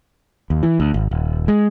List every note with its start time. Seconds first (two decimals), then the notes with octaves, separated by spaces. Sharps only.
0.50 D#2
0.63 E3
0.80 D2
0.94 G#1
1.11 D#1
1.48 G#3